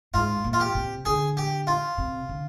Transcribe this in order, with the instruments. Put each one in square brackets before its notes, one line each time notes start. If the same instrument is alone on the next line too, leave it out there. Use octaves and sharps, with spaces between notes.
[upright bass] G#2 [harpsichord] F4
[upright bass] A#2
[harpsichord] F4
G4
[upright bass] C3
[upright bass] D3 [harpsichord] G#4
[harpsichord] G4
F4
[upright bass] C3
D3